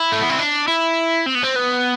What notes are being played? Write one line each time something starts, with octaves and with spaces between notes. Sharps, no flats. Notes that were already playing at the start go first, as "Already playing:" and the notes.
Already playing: E4
A3
B3
C4
D4
E4
C4
B3
C4
B3